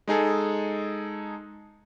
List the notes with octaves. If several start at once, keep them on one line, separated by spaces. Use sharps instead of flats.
G#3 D#4 G#4 A4